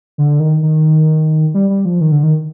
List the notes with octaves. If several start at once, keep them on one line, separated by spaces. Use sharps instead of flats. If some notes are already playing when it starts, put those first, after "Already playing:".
D3
D#3
D#3
G3
G3
F3
D#3
D3
D#3